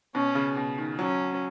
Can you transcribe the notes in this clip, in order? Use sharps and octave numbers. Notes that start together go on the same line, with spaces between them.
B2 C#4
C#3
B2
D#3
F#3 C#4